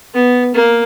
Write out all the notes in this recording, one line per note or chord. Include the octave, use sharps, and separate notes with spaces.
B3
A#3